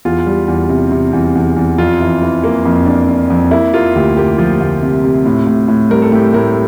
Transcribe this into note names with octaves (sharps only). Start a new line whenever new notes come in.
E2 F4
G3
E2
C3
C3
E2
E2
E2
F2 F4
E3
E3
A#3
F2
D4
D4
F2
A#3 E4
A#3 F4
D2 G4
A#3 G4
F3 F4
D2
C3
C3
A2
A2
A2
G3 A#4
A4
A2 G4
A2 A#4